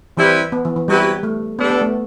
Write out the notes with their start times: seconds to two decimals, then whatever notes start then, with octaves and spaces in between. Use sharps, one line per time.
0.17 E3 G3 C4 E4 G4 B4
0.52 B3
0.65 E3
0.76 E3
0.88 F#3 G3 C4 E4 G4 B4
1.23 A3
1.58 G3 B3 D4 A4
1.70 B3
1.81 A3